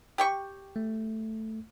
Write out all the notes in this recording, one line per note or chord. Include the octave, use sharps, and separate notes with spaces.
G4 G5 C#6
A3